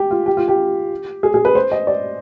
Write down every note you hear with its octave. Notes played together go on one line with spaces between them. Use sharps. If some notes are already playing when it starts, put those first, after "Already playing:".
Already playing: G4
F4
G4
F4
G4
G#4
G#4
B4
C5
D#5
D5